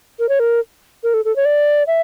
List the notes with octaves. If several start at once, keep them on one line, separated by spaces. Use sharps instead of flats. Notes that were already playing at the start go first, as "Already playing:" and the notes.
A#4
C#5
A#4
A#4
A4
A4
C#5
D5
E5